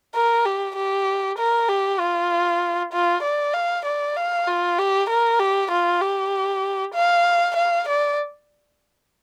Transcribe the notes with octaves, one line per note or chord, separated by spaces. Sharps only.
A#4
G4
G4
A#4
G4
F4
F4
D5
F5
D5
F5
F4
G4
A#4
G4
F4
G4
F5
F5
D5